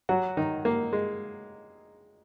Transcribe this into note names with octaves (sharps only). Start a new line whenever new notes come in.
F#3 F#4
D#3 D#4
A#3
G#3